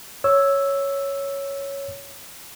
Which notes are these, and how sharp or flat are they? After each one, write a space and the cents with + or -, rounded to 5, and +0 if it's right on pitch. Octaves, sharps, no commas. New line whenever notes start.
C#5 +0 E6 +0